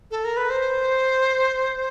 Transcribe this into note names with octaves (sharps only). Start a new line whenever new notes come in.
A4
A#4
B4
C5